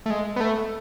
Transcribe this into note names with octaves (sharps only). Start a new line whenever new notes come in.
A3
G#3
B3
A3